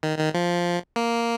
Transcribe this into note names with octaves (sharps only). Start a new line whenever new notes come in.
D#3
D#3
F3
A#3